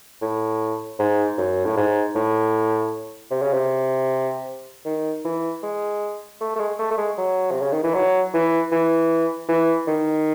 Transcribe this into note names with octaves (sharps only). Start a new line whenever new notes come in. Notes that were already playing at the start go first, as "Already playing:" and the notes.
A2
G#2
F#2
A2
G#2
A2
C3
C#3
C3
D#3
E3
G#3
A3
A3
G#3
A3
A3
G#3
F#3
C3
C#3
D#3
E3
F#3
E3
E3
E3
D#3